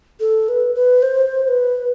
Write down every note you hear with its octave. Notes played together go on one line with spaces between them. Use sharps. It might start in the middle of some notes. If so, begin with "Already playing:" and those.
A4
B4
B4
C5
C5
B4